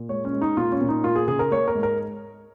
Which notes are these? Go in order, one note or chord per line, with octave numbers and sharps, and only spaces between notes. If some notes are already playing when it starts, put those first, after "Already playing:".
Already playing: A#2
G#3 C#5
C#4
G#3
D#4
A#2 F4
C#4
A#2
D#4
A#3 F4
G#4
C#3 G#4
A#4
A#3 C#5
A#4
G#2
A#4